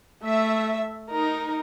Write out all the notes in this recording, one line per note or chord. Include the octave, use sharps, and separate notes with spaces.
A3 E5
D#4 A#4